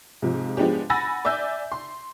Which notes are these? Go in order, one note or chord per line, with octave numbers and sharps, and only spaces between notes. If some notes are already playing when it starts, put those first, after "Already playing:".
G#2 C3 F3
F3 G#3 B3 D4 G4
F#5 G#5 B5 E6 A6 A#6
D5 E5 G#5 E6 G6
C6